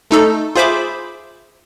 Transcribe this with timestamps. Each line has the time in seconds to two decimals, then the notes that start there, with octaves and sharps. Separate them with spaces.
0.11 A3 D#4 A4
0.55 F4 G#4 C5 E5 B5 D6